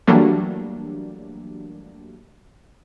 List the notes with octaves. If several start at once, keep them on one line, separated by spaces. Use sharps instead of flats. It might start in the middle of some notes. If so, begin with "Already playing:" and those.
E3 F#3 G3 A3 A#3 D4